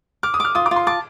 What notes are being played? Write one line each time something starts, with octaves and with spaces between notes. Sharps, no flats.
D6 F6
D#6
D6 F6
F4 D#6
D6
F4
C6
A5 D6